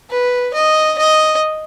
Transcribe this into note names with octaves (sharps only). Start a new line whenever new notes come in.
B4
D#5
D#5